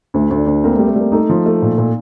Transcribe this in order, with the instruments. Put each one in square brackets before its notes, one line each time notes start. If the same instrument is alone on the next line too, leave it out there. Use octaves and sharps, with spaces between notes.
[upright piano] D2 [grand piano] A3
[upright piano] D2
[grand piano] D4
[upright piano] D2
[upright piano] A#3 [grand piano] C4
[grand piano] A3
[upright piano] G3
[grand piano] A3
[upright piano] G3 [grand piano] A#3
[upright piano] A3 [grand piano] D#4
[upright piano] F3
A3
A#2
A#2